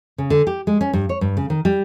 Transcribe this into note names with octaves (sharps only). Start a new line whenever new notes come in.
C#3
D3
G4
G#3
C#4
G2
C#5
G2
C#3
D#3
G3